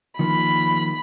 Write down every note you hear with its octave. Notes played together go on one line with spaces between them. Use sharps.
D#3 F3 A#3 B5